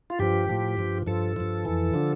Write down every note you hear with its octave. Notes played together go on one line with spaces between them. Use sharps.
F4
G2 F3 G4
A2 F3
G2 F3
G2 F3 A4
G2 F3
F2 E3
D3 F3